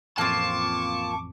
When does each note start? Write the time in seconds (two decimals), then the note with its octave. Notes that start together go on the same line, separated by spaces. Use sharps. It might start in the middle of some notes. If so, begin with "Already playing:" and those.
0.18 A1 F2 A#3 C4 F4 A5 C#6 D6